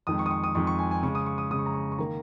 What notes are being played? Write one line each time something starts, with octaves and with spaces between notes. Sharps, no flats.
F2 D#3 G#3 D#6
C#6
D#6
C#6
D#6
F2 D#3 G#3 C#6
C#6
G#5
G#5
C#3 G#3 C#6
D#6
C#6
D#6
C#3 G#3 D#6
C#6
A#5
C#6
C#6
D#3 A#3 A#5